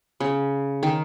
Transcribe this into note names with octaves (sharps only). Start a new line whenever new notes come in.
C#3
D#3